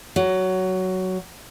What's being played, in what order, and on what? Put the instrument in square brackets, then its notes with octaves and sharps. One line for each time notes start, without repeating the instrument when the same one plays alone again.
[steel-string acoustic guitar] F#3